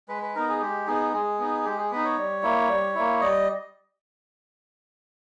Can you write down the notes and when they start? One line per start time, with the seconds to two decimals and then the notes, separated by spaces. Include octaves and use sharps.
0.09 G#3 B4
0.23 B4
0.35 B3 D#4 A#4
0.48 G#4
0.61 G#3 G4
0.87 B3 D#4 G#4
1.13 G#3 G#4
1.39 B3 D#4
1.64 G#3 G4
1.78 G#4
1.91 B3 D#4 B4
2.05 C#5
2.18 G3
2.43 A#3 E4
2.69 G3
2.95 A#3 E4
3.21 G3 D#5